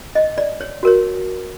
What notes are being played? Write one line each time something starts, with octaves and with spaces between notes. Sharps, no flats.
D#5
D5
C#5
F#4 A#4 C#5